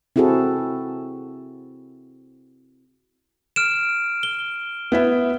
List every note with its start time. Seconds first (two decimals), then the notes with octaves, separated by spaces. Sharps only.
0.16 C4 E4 F#4 G#4 A4
3.56 F6 D7 E7
4.23 G7
4.92 B3 E4 E5